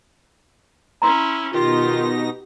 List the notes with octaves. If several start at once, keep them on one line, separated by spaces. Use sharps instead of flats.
C#4 E4 A#5 C6
B2 D#3 D#4 F4 G4 A#6